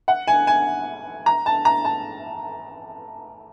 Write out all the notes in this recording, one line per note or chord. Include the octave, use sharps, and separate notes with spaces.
F#5
G#5
G#5
A#5
A5
A#5
A5